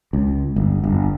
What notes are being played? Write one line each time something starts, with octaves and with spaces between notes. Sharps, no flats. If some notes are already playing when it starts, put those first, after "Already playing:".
C#2
G1
G1